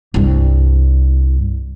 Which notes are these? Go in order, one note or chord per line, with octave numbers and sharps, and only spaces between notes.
C2 G2